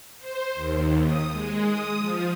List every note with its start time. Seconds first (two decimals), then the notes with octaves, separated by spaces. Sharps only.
0.18 C5
0.54 D#2
1.01 D#6
1.32 G#3
1.62 D#6
1.99 F3